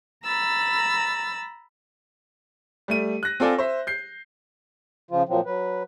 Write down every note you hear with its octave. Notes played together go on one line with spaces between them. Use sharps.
A#5 B5 E6 A6
G3 A3 D#7
F#6 A#6
C4 F4 A4 D5 G#5
C5 E5
G6 C7
C#3 F3 F4
A#2 F3 F#3 C4
F#3 B4